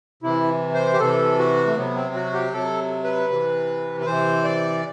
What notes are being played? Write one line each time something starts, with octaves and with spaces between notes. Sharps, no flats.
C3 E3 E4
C5
G4
C3 E3 A4
F#4
A3
C3 F#3 B3
C4
F#4
G4
C3 F#3 A4
B4
C3 E3
B4
C3 E3 C5
D5